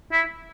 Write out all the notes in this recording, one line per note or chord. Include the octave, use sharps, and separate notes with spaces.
E4